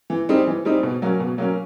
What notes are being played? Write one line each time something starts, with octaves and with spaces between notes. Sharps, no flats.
E3
G3 C4 D#4
E3
G3 C4 D#4
B2
F#3 A#3 C#4
B2
F#3 A#3 C#4